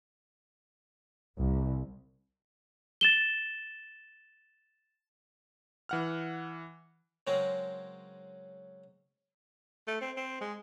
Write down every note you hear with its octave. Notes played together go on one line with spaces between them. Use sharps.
C2
A6 E7 G7
E3 F#5 F6
C#3 F#3 G#3 C4 A#4
A3
C4
C4
G#3